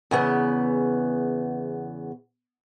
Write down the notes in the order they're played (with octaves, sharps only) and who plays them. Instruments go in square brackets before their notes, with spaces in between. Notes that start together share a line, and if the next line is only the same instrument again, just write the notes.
[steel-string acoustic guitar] E2 C#3 B3